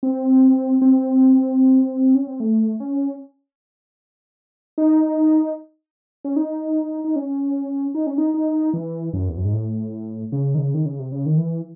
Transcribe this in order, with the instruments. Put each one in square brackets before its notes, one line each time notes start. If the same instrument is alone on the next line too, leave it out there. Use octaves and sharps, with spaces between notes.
[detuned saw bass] C4
C4
C#4
C4
A3
C#4
D#4
C#4
D#4
D#4
C#4
D#4
C#4
D#4
D#4
E3
F#2
E2
F#2
G#2
A2
C#3
D#3
C#3
D#3
C#3
C3
C#3
D#3
E3